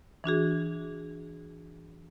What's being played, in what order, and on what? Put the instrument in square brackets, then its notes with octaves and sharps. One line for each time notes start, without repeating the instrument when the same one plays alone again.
[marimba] E3 D4 F#4 G#4